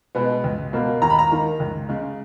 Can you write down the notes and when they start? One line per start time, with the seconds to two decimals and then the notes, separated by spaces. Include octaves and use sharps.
0.15 B2 G#3 B3
0.44 C#2
0.73 B2 A#3
1.02 D#2 A#5
1.10 B5
1.19 A#5
1.30 D#3 A#3
1.60 C#2
1.89 C#3 G#3